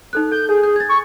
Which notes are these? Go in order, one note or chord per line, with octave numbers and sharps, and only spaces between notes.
D#4 A4 F#6
A4 G6
G#4
G6
G#6 A6
C#6